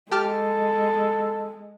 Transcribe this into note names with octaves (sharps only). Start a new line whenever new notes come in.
G#3 G4 A4 A5 F6